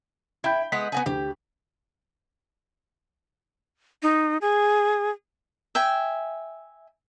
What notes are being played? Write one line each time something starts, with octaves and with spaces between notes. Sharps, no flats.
E4 G5 B5 G6
G#3 B3 F#5 B6
B3 F#4 G#4
D2 G4
D#4
G#4
E5 G5 G#5